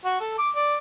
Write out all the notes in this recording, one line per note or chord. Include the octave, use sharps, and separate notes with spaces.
F#4
A4
D6
D5